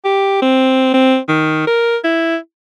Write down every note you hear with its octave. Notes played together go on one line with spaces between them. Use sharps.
G4
C4
C4
D#3
A#4
E4